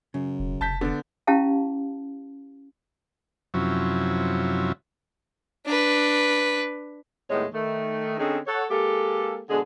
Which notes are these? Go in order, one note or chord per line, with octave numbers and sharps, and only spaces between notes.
F#2 C#3
E1
F1 A5 G6 B6
D3 B3 D4
C#4 E4 G4 F5 A5
F#2 C3 F3 F#3 C#4 E4
D4 B4
D#2 A2 G#3 A3 B3 C#5
D#3 A3
D3 C4 C#4 D#4 G#4
A4 C#5 F#5
G#3 A#3 G4 A4
B2 D3 G#3 D4 G#4